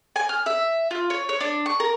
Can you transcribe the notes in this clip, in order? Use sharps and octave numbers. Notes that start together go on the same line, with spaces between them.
G#5
F6
E5
F4
C#5
C#5
D4
C#6
A#4